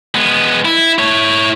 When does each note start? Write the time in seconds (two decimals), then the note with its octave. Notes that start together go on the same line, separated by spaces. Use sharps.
0.15 G#3 B3
0.65 E4
0.99 E4 C#5